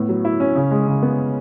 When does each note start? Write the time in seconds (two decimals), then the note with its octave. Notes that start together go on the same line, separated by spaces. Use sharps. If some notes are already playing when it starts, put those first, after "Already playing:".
Already playing: A2 B3
0.09 F#3
0.25 E4
0.40 C#4
0.56 C#3
0.71 G#3
0.87 C#3
1.03 B3